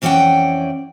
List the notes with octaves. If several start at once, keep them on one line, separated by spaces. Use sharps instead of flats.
F2 E3 C#4 D5 F#5 G5